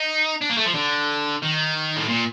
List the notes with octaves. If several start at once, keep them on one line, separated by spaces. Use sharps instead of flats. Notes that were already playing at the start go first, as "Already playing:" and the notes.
Already playing: D#4
D4
A#3
A3
F3
D3
D#3
A2
A#2